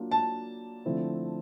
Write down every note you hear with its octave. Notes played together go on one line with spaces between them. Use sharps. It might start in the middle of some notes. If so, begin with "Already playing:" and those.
Already playing: F#3 A#3 D4 F4
A5
D3 F3 A3 C4 E4